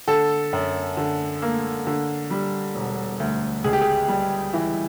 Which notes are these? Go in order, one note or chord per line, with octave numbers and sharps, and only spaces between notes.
D3 A4
F#2
D3
A#3
D3
G3
E1
D2
C#2 G#4
G4
G#4
G3
E3